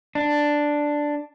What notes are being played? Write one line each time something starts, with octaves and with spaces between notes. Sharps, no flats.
D4